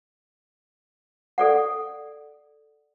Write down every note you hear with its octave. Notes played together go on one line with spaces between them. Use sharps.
A4 D5 F#5